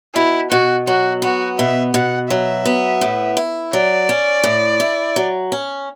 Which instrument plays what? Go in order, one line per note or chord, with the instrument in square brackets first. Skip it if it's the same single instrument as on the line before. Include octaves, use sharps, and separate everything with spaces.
[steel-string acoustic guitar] B2 [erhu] E4
[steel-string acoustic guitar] B2 [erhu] F#4
[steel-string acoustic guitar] F#3 [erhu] F#4
[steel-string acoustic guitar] B3 [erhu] F#4
[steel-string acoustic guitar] B2 [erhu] E5
[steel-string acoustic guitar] B2 [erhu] F#5
[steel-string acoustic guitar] F#3 [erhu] E5
[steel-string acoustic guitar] B3
A2
E4
[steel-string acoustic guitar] F#3 [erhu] D5
[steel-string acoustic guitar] C#4
A2
E4
F#3
C#4